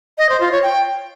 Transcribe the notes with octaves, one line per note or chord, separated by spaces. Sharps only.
D#5
C5
F4
C#5
G5